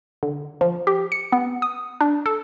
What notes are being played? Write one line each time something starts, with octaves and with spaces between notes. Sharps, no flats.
D3
F3
G4
C#7
B3
D#6
D4
A4